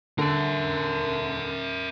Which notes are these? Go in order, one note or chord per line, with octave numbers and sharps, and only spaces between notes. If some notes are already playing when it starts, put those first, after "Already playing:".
D3 A#4 E5